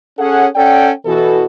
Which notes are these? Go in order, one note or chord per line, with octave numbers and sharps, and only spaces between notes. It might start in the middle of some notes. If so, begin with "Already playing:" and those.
C#4 G#4 A4 C#5 F#5
C#4 A4 D5 F#5 G5
B2 E3 F#4 A4